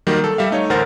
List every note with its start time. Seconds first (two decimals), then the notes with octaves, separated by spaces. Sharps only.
0.07 D#3 F#3 G3 A#3
0.24 A4
0.38 G3 E5 F5
0.51 A3 D#4 C#5
0.70 A1 D2 A#4 C5 F#5 A6